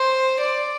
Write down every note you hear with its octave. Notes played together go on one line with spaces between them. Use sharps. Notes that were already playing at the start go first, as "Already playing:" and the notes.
Already playing: C5
D5